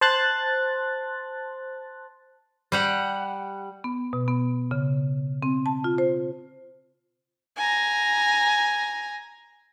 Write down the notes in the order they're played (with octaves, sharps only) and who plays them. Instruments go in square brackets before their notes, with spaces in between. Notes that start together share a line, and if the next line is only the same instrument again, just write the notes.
[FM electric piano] C5 A5 C6 F#6 A6
[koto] G3 G4 F#5
[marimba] B3
B2
B3
C#3
C4
A5
F4
C5
[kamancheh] G#5 A#5